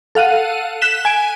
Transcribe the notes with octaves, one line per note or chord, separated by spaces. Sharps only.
A4 F5 F#5 D#7
F#6 B6 E7 G7
G#5 D7